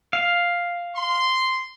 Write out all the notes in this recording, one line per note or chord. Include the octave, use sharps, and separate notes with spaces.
F5
C6